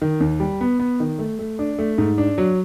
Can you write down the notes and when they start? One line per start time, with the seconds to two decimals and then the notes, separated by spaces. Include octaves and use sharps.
0.02 D#3
0.20 D#2
0.40 G3
0.61 B3
0.80 B3
1.00 D#3
1.19 A3
1.39 A3
1.59 D4
1.79 A3
1.98 G#2
2.18 D4
2.38 F#3